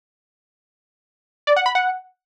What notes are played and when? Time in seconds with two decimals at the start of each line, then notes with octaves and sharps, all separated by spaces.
1.47 D5
1.56 F#5
1.66 B5
1.75 F#5